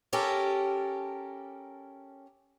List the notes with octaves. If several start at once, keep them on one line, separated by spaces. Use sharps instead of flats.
C#4 G4 A4 A#4